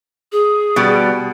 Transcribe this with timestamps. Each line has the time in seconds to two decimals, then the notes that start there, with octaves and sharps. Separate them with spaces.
0.32 G#4
0.76 B2 G3